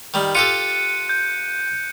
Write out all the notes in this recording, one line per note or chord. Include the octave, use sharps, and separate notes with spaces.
D#3 G3
F4 G4 A4 F#6 C#7 D#7
G6